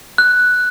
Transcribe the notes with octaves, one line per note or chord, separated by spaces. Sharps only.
F#6